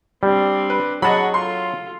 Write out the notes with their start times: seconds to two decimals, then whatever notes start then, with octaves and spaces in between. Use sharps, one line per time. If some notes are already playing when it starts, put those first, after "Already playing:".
0.23 G3 C4 D4
0.70 B4
1.02 F#3 G#4 D#5 F#5 A5 B5 C#6
1.34 F4 A4 C6